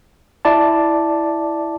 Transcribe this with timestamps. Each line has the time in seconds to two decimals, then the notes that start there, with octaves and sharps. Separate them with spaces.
0.45 E4 D5 A5